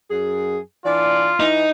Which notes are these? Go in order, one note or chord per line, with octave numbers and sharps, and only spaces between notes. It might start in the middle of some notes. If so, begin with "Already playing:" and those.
F#2 G#4
E3 D4 F4 D5
E3 D#4